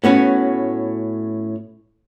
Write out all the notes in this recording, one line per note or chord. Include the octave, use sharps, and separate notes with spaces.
A2 B3 C#4 F#4